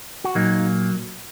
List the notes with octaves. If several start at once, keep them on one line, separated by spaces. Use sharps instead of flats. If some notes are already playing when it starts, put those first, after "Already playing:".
F#4
A#2 F#3 A#3 D#4